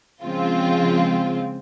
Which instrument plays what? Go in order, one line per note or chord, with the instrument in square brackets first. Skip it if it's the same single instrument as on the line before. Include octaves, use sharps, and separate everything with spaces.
[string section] C#3 F3 G#3 C4 F4